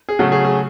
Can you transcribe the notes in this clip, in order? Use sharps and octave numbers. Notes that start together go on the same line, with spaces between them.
G#4
C#3 F#3 A3 F#4
G#4
G#4